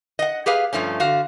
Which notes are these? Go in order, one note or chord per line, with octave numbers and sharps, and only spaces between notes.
D#5 F#5
G4 G#4 B4 F5
G2 F3 A3 C#4
D3 F#4 F5